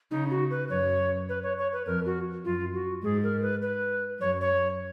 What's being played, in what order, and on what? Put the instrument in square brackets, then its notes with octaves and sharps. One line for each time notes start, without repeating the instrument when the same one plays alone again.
[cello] C#3 [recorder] D#4
[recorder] F#4
B4
[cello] F#2 [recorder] C#5
[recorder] B4
C#5
C#5
B4
[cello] F2 [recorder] A#4
[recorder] F#4
[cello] F#2 [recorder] F4
[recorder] F#4
[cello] G#2 [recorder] G#4
[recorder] A#4
B4
B4
[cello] F#2 [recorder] C#5
[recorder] C#5